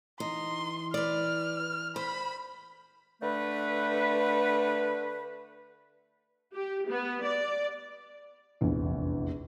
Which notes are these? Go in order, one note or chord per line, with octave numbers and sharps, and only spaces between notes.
E3 D#4 C6
B4 D5 F6
C5 B5
D3 A3 B4
G4
B3
D5
F1 A#1 E2